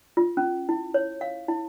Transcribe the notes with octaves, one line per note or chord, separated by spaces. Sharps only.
F4
C#4
E4
C#5
F5
E4